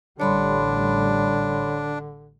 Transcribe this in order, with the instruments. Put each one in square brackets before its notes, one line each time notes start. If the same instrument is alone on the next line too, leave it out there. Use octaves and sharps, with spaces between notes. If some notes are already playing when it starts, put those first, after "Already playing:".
[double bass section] A1 A2 G3 [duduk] D3 [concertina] D4 [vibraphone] C#5 B5 C6